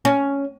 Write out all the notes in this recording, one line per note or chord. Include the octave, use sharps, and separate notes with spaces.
C#4